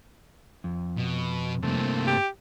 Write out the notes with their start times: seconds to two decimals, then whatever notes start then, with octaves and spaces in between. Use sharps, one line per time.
0.64 F2
0.98 B2
1.63 G2 C3 A3 A#3
2.07 G4